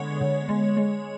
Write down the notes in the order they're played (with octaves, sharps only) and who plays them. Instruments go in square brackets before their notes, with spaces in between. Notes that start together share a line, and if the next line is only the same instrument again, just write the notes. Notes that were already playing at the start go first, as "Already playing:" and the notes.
Already playing: [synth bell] D3 G#3 B3 C#5
D3
G#3
G#3